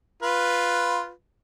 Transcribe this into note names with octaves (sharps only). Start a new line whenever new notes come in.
F4 B4